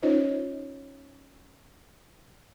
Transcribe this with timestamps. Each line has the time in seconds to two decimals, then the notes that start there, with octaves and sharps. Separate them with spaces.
0.02 C#4 D#4 F4 C5 C#5 D#5